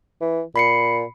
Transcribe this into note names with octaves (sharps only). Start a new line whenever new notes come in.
E3
A#2 B5 C7 C#7